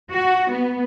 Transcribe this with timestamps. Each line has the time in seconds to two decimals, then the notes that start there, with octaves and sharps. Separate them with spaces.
0.10 F#4
0.51 B3